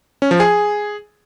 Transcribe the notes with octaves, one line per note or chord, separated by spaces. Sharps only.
C#4
F3
G#4